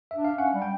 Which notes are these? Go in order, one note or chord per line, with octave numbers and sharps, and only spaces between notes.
D4 E5
F5
C#4 F#5
G3
G5